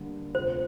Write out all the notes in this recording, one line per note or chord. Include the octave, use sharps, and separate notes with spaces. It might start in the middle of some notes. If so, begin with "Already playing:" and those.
Already playing: D3 G3 A#3
D2 C3 F3 C5